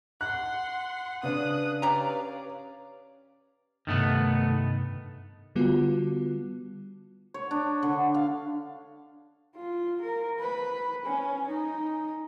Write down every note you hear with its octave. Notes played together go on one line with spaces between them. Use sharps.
F#5 C6 F#6
C#3 D4 B4 D#6 F#6
C#4 G4 D5 F5 A#5
G2 C3 D#3 A3 B3
D3 G3 B3 F4 F#4
C#5
D4
D3
F5
F4
A#4
B4
C#4
D#4